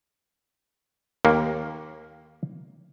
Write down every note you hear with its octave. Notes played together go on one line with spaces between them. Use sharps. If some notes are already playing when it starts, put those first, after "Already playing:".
D#2 A#3